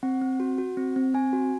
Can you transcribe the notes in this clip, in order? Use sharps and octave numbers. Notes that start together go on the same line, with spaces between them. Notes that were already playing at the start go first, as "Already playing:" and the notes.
C4 F#5
C4
F#4
F#4
C4
C4
C4 G#5
F#4